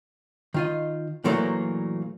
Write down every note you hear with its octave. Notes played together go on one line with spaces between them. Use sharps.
D#3 F4 D#5
A#2 E3 F#3 A3 A#3